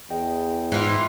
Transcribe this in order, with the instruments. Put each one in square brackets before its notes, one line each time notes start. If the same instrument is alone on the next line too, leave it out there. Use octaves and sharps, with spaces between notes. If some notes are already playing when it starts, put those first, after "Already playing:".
[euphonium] E2 [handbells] G#4 D#5 G5
[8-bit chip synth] G#2 [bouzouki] E3 F4